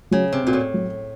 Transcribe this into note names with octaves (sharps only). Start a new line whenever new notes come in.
C#3 F#3
C3
A#2 C4 F#4
A2
F#3